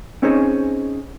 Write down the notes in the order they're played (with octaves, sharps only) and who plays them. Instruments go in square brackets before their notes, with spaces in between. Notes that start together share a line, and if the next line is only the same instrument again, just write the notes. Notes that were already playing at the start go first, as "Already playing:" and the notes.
[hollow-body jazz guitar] C4 C#4 D#4 G#4 C5 C#5